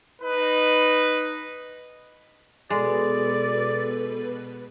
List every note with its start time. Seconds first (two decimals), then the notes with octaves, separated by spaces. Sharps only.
0.22 D#4 B4
2.70 B2 G#3 A4 B4 D5